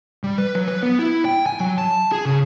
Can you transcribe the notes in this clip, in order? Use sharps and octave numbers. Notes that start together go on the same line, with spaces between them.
G3
B4
F#3
B4
B3
E4
G5
G#5
F#3
A5
G#4
C#3